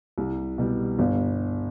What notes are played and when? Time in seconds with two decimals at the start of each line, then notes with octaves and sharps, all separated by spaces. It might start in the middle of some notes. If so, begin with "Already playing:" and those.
0.18 C2
0.58 B2 G3
0.99 G1